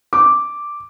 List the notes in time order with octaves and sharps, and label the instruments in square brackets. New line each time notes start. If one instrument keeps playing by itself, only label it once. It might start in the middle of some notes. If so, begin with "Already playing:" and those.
[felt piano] D6